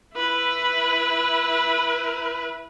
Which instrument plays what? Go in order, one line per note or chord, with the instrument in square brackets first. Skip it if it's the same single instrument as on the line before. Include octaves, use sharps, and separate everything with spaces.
[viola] E4 B4